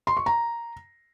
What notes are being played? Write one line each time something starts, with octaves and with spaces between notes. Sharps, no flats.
C6
C#6
A#5